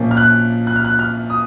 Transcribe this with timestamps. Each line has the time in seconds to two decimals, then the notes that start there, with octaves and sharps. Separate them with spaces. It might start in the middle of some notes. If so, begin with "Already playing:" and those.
Already playing: A#1 A#2 F3 A#3 C#4
0.11 F6
0.17 F#6
0.67 F#6
0.76 F6
0.85 F#6
0.99 F6
1.30 D#6